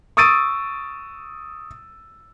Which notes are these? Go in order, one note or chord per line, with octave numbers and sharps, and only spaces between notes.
C#6 D#6 E6 A6 D7 D#7